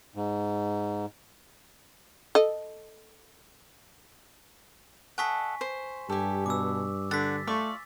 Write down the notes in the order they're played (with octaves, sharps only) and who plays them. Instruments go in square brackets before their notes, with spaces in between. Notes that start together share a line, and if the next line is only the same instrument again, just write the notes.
[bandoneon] G#2
[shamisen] A4 D#5
[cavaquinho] A4 D#5 F#5 [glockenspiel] G#5 C#6 B6
[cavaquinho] C5
[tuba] G2 [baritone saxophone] G4 [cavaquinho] A4 G#5
[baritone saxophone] B2 [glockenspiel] D6 E6
[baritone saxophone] D3 [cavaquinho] F#5 [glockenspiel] A6 B6
[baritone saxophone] A3 [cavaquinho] F4 D5 C#6